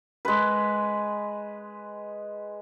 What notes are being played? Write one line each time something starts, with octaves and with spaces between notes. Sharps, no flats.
G#3 B4